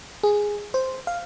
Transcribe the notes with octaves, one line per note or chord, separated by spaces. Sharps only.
G#4
C5
F5